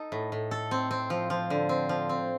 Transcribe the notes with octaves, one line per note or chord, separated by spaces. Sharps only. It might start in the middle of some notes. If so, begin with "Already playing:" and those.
Already playing: D#4 A4
A2
A2
A4
C4
C4
F3
F3
D3
C4
F3
C4